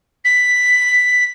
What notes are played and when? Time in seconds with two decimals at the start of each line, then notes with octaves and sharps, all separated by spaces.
0.24 B6